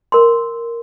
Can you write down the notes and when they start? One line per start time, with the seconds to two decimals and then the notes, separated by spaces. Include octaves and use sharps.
0.12 A#4 C6